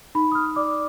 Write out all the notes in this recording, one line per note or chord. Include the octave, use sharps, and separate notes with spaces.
D#4 B5
D#6
F6
D5 D6